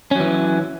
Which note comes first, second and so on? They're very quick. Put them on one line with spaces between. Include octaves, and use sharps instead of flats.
C#4 F#3 E3